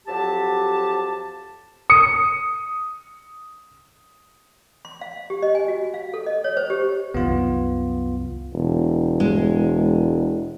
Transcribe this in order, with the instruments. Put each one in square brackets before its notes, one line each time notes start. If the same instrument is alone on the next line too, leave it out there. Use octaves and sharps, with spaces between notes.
[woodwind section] F2 F#3 G4 A5
[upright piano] D#6 C#7
[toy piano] C6
F5
G4
D#5
G#5
F#4
F5
A4
D#5
C#5
C5
G4
[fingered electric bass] C2 F#2 D#3 [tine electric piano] B3 F4
[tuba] E1
[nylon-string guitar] G#3